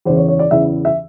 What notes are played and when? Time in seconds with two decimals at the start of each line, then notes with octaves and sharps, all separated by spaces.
0.05 E2 C#3 E3 C5
0.17 C#5
0.29 C#5
0.39 D5
0.51 E2 C#3 E3 E5
0.85 E5